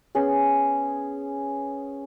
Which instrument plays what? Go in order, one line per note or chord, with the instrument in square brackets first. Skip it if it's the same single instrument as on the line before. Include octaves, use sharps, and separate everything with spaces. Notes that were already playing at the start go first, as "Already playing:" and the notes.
[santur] B3 C#4 G#4